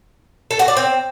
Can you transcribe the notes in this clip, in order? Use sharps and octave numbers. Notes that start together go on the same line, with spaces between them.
A4
F#4
D5
C4